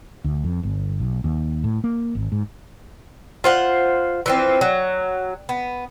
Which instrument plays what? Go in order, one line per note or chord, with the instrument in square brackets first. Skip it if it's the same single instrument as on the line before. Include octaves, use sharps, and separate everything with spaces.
[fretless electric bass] D2
F2
G1
B1
D#2
A2
A#3
G#1
G#2
[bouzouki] F4 C5 F#5
E3 F3 C4
F#3
B3